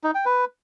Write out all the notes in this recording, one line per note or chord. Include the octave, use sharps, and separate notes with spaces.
D#4
G5
B4